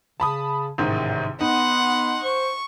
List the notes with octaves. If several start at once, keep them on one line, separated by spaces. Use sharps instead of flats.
C#3 A5 B5 D#6
A1 G#2 C3 D#3
B3 D#4 F#5 C6
C5 C#6